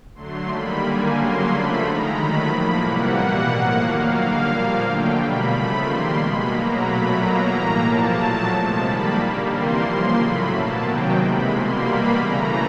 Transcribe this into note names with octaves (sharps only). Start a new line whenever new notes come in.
D3 F#3 A3 C6
D#3 G3 A#3 B5
D3 G3 A#3 G#5
C#3 F#3 A#3 C6
D3 F3 A3 B5
D#3 G#3 A#5
D#3 F#3 A3 B5
A2 F3 A#3 B5
C3 E3 G3 A#3 F#5
B2 G3 A#3
A2 F3 A#3
D#3 F#3 A#3 F5
D3 G3 A#3
A#2 F3 A#3
D3 F#3 A3 G5
B2 G3 A#3 B5
C#3 F3 A3 B5
D#3 G3 A#3 C6
B2 G#3 B5
B2 F#3 A#3 A#5
A#2 F#3 A3 B5
B2 F#3 A#3 A#5
A2 E3 G3 A#3
A2 F3 A#3 A5
A#2 F#3 A3
C3 F3 G#3 A5
D#3 G3 A#3 B5
D3 G3 A#3
C3 E3 G3 A#3 C6
C#3 F3 A#3 C6
A2 F#3 A3 B5
B2 F#3 A#3 A5
C3 D#3 F#3 A#3 G5
C3 E3 G#3 B5
B2 G3 A#3 C6
B2 G3 A#3 B5
C#3 E3 A3 A#5